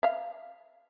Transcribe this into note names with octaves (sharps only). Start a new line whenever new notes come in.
E5 F5